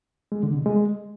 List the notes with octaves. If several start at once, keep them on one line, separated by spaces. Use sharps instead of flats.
G#3
D3
C3
G#3